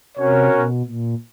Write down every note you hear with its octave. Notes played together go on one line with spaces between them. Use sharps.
C3 C#4 F#4 A#4 C#5
B2
A#2